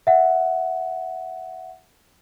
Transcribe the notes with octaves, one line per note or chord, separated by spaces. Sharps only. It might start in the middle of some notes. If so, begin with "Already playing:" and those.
E5 F#5